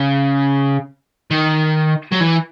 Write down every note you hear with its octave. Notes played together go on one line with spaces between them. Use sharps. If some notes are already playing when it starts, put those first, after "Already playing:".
Already playing: C#3
D#3
F#3
E3